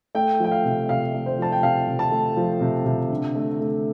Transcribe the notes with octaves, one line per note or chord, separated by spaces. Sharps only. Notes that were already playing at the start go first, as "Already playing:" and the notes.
A3 G5
F3 G5
F5
C3
C3 F5
A3
C5
F3 A5
G5
C3 F5
C3
A5
A3
F3
C3
C3
D3
A3
A3